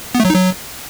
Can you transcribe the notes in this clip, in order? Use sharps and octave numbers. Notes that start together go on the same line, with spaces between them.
B3
A3
F#3
D#4
F#3